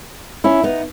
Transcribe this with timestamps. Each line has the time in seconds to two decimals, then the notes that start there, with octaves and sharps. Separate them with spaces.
0.44 C#4 E4
0.63 B3 D#4